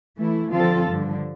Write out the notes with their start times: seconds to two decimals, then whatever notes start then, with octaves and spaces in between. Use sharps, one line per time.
0.18 E3 A3 E4
0.52 D3 F3 C4 F4 A4
0.87 G2 D3 F3